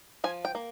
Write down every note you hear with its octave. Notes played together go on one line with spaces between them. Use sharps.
F3 G#5
G5
A#3